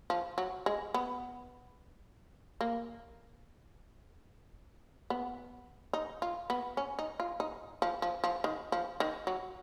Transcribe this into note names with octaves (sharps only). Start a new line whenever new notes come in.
F3
F#3
G#3
B3
A#3
B3
D#4
F4
B3
C#4
D#4
F4
D#4
F3
F3
F3
D#3
F3
D#3
F#3